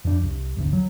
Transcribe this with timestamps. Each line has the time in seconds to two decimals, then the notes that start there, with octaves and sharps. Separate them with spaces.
0.05 F2 D4
0.23 C2
0.57 G1 D2
0.73 F#3